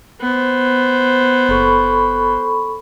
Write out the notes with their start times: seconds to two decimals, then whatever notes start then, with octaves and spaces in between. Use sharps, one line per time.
0.21 B3 C5
1.49 F#1 A4 B5 C#6